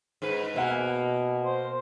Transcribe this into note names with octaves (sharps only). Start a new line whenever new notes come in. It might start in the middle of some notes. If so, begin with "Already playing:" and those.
G#2 G#3 B4
B2 A#3 E5 F#5 G#5
C5